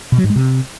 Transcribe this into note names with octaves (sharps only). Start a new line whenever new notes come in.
B2
F#3
G#2
G#3
C3